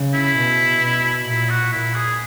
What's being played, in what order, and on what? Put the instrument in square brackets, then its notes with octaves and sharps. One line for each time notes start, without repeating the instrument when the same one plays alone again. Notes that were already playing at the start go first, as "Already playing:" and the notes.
Already playing: [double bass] C#3
[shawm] E4
[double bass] B2
B2
[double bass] A#2 [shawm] E4
[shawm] F#4
[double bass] A#2 [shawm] E4
[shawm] G#4